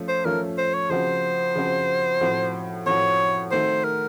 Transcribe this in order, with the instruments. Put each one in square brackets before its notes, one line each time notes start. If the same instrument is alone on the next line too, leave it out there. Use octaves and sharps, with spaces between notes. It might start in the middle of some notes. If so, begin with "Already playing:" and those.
Already playing: [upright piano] F3 A3 C#4 F4
[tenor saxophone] C5
[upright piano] F3 A3 C#4 F4 [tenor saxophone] A#4
[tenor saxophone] C5
C#5
[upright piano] C#3 F3 C4 F#4 [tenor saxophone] C5
[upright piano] C#3 F3 C4 F#4
A2 F3 C4 F#4
[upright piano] A2 F3 C4 F#4 [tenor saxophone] C#5
[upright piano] D#3 A3 C4 F#4 [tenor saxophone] C5
[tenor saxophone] A#4